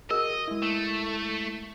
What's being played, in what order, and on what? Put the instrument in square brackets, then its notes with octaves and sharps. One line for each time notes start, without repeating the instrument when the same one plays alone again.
[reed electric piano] F#4 G#4 [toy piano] A#4 [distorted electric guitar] D#5
[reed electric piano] G#3 E4
[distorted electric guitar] A3